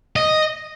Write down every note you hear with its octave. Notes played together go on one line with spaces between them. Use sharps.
D#5